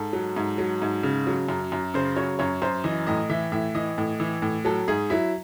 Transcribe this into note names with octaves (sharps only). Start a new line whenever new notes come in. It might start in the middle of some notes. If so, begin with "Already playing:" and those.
Already playing: G#2 A4
F#3
G#2
F#3
G#2
C#3
F#3
F#2
F#2
C#3 C5
F#3 C#5
F#2 C#5
F#2 C5
E3 D#5
A2 D#5
E3 E5
A2 E5
E3 D#5
A2
E3
A2
F#3 A4
G#2 G#4
F#3 E4